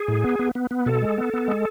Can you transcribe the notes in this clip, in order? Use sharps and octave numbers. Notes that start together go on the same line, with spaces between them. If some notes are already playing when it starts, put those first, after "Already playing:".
Already playing: G#4
A2
B3
B3
B3
B3
B2 A4
G#3
B3
B3
G#3